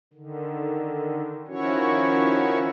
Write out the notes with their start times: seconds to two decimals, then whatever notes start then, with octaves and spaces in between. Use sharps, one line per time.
0.13 D3 D#3
1.47 D#3 F3 C#4 E4 F#4 C#5